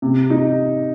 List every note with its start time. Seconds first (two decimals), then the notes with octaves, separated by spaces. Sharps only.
0.02 C3
0.30 D#4